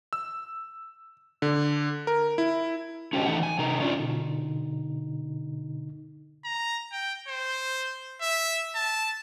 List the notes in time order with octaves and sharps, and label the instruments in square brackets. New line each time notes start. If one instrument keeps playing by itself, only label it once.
[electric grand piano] E6
D3
A#4
E4
[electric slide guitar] C#4 F#4 G4 C5 D5 D#5
E3 A3 D#4 F#5
G#5
C3 D#4 A#4
C#4 D4 F4
[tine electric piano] B2 D3 D#4
[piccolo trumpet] A#5
G5
C5
E5
A5